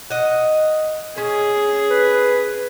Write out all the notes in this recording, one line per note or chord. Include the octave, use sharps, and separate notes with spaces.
D#5 F#5
C#4 G#4
B4